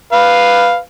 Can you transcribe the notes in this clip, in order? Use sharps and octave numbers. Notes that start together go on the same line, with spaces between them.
B4 F5